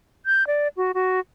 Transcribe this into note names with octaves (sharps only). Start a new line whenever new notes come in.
G6
D5
F#4
F#4